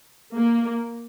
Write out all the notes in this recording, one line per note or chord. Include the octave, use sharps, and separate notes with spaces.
A#3